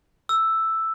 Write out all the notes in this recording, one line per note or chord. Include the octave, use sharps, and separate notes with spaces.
E6